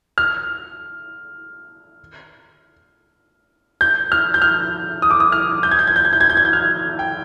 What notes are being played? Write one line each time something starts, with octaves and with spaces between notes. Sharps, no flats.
F6
G6
F6
G6
F6
D#6
D6
D#6
F6
G6
G#6
G6
G#6
G6
G#6
G6
G#6
G6
G#6
G6
F6
G5